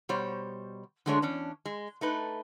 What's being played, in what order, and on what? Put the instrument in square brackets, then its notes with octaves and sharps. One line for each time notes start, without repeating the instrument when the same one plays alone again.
[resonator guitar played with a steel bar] B2 G3 C5 C#5
D3 F#3 G#3 A3 D4 C#5
E2 C#4 D4
G#3
A3 D#4 B4